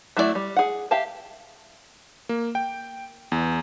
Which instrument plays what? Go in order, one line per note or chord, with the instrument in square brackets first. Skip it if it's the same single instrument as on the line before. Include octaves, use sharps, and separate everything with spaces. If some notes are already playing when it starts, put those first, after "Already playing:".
[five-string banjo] F#3 A3 E4 G#4 D5
G3
G#4 F#5
G4 E5 F5 G5 A5
[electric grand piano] A#3
G5
E2